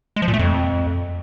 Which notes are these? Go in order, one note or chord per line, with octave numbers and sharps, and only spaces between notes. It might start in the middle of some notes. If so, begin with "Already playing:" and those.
G#3
F3
A#2
A3
F2